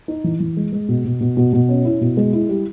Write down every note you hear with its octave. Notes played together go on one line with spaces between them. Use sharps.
D#4
E3
E3
G#3
G#3
B2
B2
B2
B2
B2
C#4
E4
B2
G#3
E4
G3